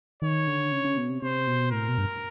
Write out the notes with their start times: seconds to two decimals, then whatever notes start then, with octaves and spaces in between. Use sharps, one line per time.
0.22 D#3 C#5
0.47 D3
0.72 C#3
0.85 C#3
0.97 B2
1.10 C3
1.22 C3 C5
1.47 B2
1.72 A2 A#4
1.89 B2
1.98 G2